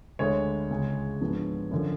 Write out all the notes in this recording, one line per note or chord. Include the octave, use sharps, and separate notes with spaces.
D2 D3 G#3 C#5
C#2 C#3 G#3
G#2 F3 B3 D4
F#2 D3 F3